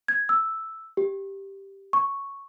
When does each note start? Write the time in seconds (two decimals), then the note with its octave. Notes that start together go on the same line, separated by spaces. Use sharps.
0.08 G#6
0.29 E6
0.97 G4
1.93 C#6